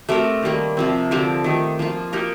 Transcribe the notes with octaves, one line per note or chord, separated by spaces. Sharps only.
A3 C4 G4 A#4
D#3 G3 A#3
C3 F3 C4
D3 F3 C4 G4
D#3 A3 D#4 G4
F3 A#3 F4
A#3 D#4 G4 A#4